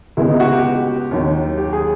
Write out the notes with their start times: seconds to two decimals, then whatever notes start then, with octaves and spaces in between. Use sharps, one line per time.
0.17 C#2 B2 G#3 B3 E4
0.28 D#4
0.40 F#4
0.52 G4
1.11 D#2 D#3 F#3
1.58 G4
1.73 G#4